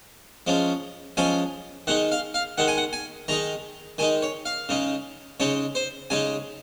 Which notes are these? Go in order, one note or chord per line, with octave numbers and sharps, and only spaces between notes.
F3 G#3 C#4
F3 G#3 C#4 G#5
D#3 G#3 D#4 F#5
F5
F5
D#3 G#3 D#4 F#5
G#5
F#5
G#5
D#3 G#3 D#4 A#5
D#3 G#3 D#4 G#5
C#5
F5
C#3 G#3 D#4
C#3 G#3 D#4 C#5
C5
C#3 G#3 D#4 G#5